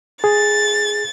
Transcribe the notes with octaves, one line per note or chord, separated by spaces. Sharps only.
G#4 A6